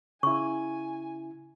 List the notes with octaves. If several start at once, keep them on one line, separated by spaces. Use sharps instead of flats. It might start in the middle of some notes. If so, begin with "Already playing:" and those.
C#3 E4 G#5 C#6